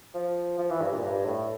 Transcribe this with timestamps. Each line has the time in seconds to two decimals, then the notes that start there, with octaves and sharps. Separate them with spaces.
0.14 F3
0.59 F3
0.70 E3
0.81 G2
0.92 A#2
1.04 G2
1.25 A2